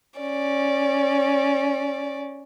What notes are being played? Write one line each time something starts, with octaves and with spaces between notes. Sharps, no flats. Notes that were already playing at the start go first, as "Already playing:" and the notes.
C#4 D5